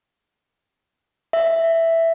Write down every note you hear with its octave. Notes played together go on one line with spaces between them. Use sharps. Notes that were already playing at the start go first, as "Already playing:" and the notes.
E5